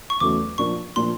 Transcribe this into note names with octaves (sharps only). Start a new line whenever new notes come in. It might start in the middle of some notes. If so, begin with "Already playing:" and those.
C#6
E2 C#3 F#3 A3 D6
A#2 F3 A#3 D4 C#6
A#2 F3 A#3 D4 C6